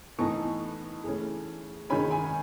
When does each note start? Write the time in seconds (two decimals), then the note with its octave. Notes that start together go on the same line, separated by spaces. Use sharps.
0.19 A2 E3 B3 D#4 A5 C#6
1.04 C#3 E3 A3 C#4
1.90 D#3 G#3 C#4 G#5 B5
2.11 G#5 B5